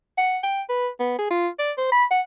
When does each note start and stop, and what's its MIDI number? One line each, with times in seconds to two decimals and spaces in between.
0.18 0.38 78
0.43 0.62 79
0.69 0.88 71
1.00 1.18 59
1.19 1.30 68
1.31 1.48 65
1.59 1.72 74
1.78 1.88 72
1.92 2.05 83
2.11 2.21 78